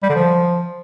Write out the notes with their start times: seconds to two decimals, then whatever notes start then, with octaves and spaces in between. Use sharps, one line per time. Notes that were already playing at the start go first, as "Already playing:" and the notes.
0.03 G3
0.09 D3
0.15 F3